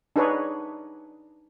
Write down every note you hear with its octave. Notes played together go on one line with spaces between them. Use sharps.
D4 D#4 G#4 B4 C#5